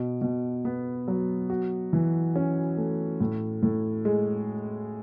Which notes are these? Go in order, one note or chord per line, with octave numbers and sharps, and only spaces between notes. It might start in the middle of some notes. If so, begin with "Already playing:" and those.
Already playing: B2
B2
B3
F#3
F#4
E3
C#4
A3
A2
A2
G#3